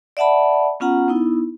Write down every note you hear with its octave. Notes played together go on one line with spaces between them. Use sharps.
D5 E5 F#5 A5 B5
B3 C#4 F4 F#5 A#5
B3 D#4 E4